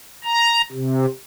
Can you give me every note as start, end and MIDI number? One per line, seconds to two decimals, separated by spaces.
0.24 0.61 82
0.72 1.05 48